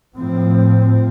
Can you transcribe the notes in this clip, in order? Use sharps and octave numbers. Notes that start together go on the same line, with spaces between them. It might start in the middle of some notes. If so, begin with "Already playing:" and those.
A2 F3 C4